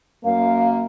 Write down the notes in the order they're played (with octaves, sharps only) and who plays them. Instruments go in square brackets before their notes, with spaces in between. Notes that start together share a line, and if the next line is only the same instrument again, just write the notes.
[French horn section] F#2 A#3 [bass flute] F5